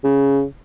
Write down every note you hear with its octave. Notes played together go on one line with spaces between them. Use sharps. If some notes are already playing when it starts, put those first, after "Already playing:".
C#3